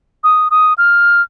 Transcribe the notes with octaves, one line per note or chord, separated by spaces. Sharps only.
D#6
D#6
F6